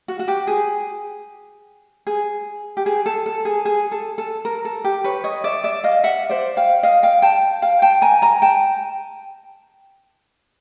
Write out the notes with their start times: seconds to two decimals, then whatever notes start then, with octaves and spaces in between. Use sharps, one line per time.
0.08 F#4
0.19 F#4
0.28 G4
0.47 G#4
2.07 G#4
2.77 G4
2.86 G#4
3.06 A4
3.26 A4
3.45 G#4
3.65 G#4
3.92 A4
4.18 A4
4.45 A#4
4.65 A4
4.84 G4
5.04 B4 C#5
5.24 C#5 D#5
5.44 D5 E5
5.64 D5 E5
5.84 D#5 F5
6.04 E5 F#5
6.29 C5 D5
6.57 F5 G5
6.83 D#5 F5
7.03 F5 G5
7.22 G5 A5
7.62 F5 G5
7.82 G5 A5
8.02 G#5 A#5
8.22 G#5 A#5
8.42 G5 A5